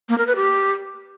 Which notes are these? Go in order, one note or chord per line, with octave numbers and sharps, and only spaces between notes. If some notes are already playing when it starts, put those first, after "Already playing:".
A#3
A#4
B4
G4